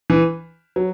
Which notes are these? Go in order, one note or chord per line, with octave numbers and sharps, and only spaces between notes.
E3
F#3